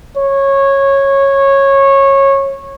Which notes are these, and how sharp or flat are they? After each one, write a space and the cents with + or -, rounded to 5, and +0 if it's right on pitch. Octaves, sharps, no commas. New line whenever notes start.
C#5 -15